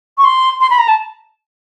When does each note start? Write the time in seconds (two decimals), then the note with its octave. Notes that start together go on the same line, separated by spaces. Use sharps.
0.18 C#6
0.24 C6
0.61 C6
0.70 B5
0.79 A#5
0.88 A5